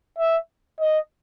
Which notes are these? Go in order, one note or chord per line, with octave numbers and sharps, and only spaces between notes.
E5
D#5